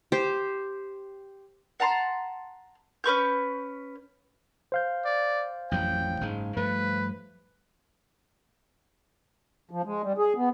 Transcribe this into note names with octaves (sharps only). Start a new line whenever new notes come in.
G4 C5
F#5 A5 A#5 C6
C#4 B4 C#6 G6
C5 F5 G6
D5
A1 F2 F#3 G5
F#1 G#2 G#3
G2 F3 A3 B4
F3
G#3
G3
G#4
B3